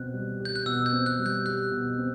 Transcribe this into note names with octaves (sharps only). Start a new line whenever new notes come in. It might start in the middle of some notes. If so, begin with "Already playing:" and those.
Already playing: B2 C4 F#6
G3
G4
G6
F#6
B2 E6
G6
C4
F#6
G3
G6
G4 F#6
B2
C4